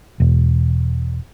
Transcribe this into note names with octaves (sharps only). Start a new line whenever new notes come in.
E1